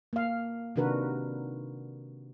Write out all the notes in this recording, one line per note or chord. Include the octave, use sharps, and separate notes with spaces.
A#3 F5
C3 D#3 D4 F#4 A#4 B4